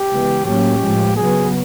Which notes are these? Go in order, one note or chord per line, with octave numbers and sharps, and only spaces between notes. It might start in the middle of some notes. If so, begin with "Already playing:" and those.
Already playing: G4
C#3 E3 G#3 B3
A2 F#3 A#3 C#4 G4
A2 F3 G#3
C#3 F#3 B3 G#4